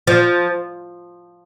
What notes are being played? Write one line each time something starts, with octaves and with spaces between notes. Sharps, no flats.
F3